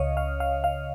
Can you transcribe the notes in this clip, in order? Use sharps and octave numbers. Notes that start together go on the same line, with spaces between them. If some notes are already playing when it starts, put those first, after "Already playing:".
Already playing: C#2 C#3 C#5 D#5 F5
F5
F5
F5